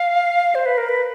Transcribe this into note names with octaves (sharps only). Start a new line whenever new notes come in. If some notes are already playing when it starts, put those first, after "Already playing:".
Already playing: F5
C5
B4
A#4
B4